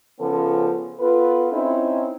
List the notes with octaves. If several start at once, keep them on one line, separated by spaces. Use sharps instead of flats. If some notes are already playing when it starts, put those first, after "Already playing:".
C#3 F3 B3 C#4 A4
B3 F4 A4 B4
C4 C#4 D#4 E4